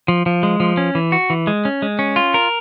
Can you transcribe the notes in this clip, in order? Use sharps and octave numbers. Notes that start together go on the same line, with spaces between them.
F3
F3
G#3
F3
C#4
E3
F#4
E3
G#3
C#4
G#3
C#4
F4
A#4